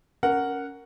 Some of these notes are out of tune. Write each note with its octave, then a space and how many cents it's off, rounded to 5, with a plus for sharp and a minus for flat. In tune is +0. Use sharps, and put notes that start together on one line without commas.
C#4 +10 A#4 -5 F#5 +0